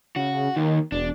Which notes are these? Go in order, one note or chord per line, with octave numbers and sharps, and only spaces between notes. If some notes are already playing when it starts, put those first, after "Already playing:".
C#3 F#4
D#2 D#3
E1 D4